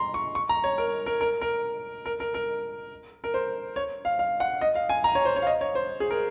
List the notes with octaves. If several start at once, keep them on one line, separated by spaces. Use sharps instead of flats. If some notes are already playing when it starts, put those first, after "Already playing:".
Already playing: A#5 C6
C#6
C#6
A#5
C#5
A#4
A#4
A#4
A#4
A#4
A#4
A#4
A#4
C5
C#5
F5
F5
F#5
D#5
F5
G#5
A#5
C#5
C5
C#5
F5
D#5
C#5
C5
G#4
A#4